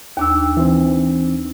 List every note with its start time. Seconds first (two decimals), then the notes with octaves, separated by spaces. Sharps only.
0.17 D#2 D4 E6
0.57 E3 C4